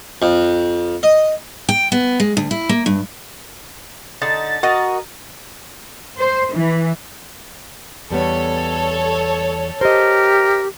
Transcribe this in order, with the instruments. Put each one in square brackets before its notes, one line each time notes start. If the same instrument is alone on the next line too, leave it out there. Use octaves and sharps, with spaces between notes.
[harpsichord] F2
D#5
[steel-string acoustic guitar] G5
B3
G#3
D2
E4
A#3
G2
[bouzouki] D3 D#4 A5 [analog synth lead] A6
[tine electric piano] F#4 [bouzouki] A#4 D#5
[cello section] C5
E3
[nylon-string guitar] E2 G3 B3 [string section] A4 C#5
[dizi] G4 [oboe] A#4 [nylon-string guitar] C5 D#5